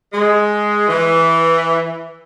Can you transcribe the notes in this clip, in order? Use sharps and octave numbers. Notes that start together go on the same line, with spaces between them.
G#3
E3